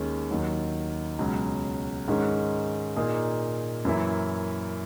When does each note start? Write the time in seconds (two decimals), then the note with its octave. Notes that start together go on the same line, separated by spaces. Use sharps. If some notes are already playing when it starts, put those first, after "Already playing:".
Already playing: D#2 D#3 G#3 C#4 G#4
0.30 D#2 D#3 F#3
1.19 C#2 B2 F#3 C#4
2.08 G#2 D#3 G#3 C#4
2.96 A#2 A#3 D#4 G#4
3.85 F#2 E3 A#3 E4